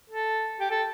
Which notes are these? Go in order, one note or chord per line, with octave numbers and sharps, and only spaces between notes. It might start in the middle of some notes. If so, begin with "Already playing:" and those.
A4
G4
A4